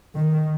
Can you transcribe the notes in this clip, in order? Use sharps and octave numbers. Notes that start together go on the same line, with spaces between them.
D#3